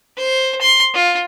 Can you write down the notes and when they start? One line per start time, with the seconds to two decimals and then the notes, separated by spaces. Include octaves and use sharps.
0.17 C5
0.61 C6
0.94 F4